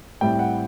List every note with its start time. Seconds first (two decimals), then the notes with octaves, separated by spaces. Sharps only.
0.21 A2 G3 C4 E4 G5
0.39 F#5